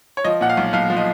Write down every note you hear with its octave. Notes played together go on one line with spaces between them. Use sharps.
C#5
F3 D#5
A#2 F#5
F5
B1
B1 F5
F3
D#5